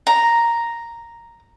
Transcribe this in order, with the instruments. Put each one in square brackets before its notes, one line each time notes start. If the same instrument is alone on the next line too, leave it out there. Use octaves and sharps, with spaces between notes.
[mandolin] A#5